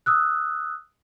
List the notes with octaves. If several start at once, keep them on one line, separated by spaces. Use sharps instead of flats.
D#6 E6 F#6